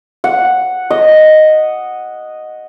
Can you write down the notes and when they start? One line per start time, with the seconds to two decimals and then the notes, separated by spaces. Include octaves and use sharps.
0.24 F#5
0.90 D#5